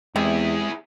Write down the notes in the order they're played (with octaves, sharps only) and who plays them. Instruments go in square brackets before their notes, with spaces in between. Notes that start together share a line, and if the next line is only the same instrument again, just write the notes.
[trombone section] E2 [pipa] C3 [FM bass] G#3 [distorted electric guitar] E4 G#4